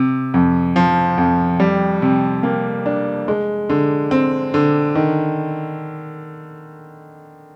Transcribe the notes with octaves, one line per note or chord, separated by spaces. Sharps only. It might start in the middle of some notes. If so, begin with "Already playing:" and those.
Already playing: C3
F2
F3
F2
G3
C3
A#3
D4
G#3
D3
C4
D3
D#3